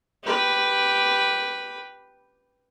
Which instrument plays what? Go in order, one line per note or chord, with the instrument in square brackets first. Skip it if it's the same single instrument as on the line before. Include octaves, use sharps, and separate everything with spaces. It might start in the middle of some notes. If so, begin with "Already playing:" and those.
[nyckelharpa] G4 B4